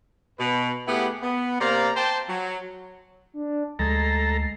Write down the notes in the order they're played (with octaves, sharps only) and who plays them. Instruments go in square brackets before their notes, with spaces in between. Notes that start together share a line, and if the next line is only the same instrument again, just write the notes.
[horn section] B2 B4
A3 B3 E4 G4 G#4 F#5
B3
C3 A#3 C5 D5 F5 A#5
C5 G5 A5
F#3
[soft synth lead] D4
[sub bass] D2 [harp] G#3 G#6 [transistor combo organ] A4 A#5 [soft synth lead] C7